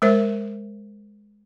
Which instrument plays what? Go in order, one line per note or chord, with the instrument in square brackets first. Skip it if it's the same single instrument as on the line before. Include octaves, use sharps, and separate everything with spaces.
[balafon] G#3 A#4 C5 E5